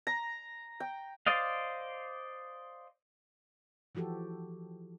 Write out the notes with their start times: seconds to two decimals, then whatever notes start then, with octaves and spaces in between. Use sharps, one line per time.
0.07 A#5
0.80 G5
1.26 C5 D5 D#5 F5
3.95 E3 F3 F#4 G4 A4